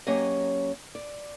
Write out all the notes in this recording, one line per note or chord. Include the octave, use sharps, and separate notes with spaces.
F#3 A#3 C#4 G4 D#5
D5